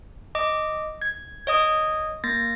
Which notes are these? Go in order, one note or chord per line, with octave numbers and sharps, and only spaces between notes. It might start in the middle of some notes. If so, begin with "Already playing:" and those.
D#5 D6
G#6
C#5 D#5 D#6
A#3 A6 A#6